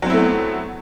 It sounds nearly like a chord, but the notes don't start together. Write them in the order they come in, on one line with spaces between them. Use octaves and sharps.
F#3 C4 E4 A3 B3